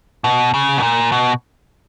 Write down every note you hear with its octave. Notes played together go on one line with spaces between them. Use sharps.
B2
C#3
B2
A#2
B2